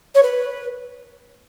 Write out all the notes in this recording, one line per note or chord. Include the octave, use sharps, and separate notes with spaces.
C#5
B4